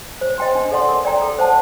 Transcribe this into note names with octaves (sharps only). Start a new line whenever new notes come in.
C5
D#5 G5 C6
D4
A4 D5 F#5 C6
A#4
D5 G5 A#5
A4
C5 F#5 A5